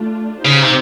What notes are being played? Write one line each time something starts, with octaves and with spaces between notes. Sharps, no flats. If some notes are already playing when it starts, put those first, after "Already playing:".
Already playing: A3 D4 F4
C#3 C4 D#4 G4 C5
C3